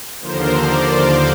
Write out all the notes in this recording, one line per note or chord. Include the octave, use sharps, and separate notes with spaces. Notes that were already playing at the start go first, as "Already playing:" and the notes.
D#2 D3 F3 A#4 C5
C5 D5
C5 D5